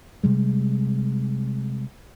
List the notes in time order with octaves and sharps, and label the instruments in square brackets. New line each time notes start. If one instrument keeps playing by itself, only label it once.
[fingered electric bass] C3 G3 G#3